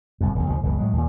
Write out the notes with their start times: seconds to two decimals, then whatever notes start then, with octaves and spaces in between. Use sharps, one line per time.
0.21 G1 C2 F2
0.35 D#1 B1
0.50 D2 C#3 F3
0.63 F#1 C#2 B2 D#3
0.78 A2 F#3 G#3
0.93 D#2 A#2